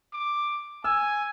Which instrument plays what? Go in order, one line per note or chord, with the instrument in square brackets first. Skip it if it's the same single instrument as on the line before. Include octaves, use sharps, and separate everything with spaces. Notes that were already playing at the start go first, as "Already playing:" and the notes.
[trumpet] D6
[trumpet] G#5 [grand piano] E6